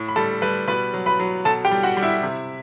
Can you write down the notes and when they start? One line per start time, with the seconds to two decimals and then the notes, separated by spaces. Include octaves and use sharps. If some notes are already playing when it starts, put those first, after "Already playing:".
Already playing: A2
0.09 B5
0.16 G3 A4 A5
0.42 G3 B4 B5
0.68 B2 B4 B5
0.93 F#3
1.06 B4 B5
1.19 F#3
1.45 B2 A4 A5
1.65 G4 G5
1.71 G3
1.83 F#4 F#5
1.97 G3
2.03 E4 E5
2.23 C3